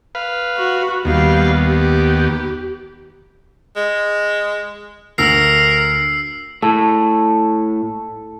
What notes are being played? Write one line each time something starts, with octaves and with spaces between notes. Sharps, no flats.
B4 F5
F#4
D#2 G3 B3 F5
G4
G#3
D2 A#4 E6 C7
A2 A4